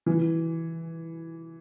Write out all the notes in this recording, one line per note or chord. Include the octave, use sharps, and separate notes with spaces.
E3